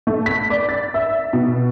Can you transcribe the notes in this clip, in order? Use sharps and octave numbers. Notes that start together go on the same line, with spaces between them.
A3
B6
D5
A6
E5
B2